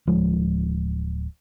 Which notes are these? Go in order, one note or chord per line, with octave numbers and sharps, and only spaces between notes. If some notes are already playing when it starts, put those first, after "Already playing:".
D1 F3 G#3